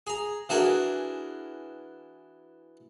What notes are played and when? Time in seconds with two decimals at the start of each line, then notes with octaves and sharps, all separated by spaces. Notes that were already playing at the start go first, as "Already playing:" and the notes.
0.07 G#4 A#5
0.49 E3 D4 F#4 G#4 A#4 B4